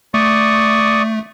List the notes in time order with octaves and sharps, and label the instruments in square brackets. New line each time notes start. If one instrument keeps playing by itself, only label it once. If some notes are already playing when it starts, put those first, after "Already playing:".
[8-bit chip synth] A3 [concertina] D5 C#6 D#6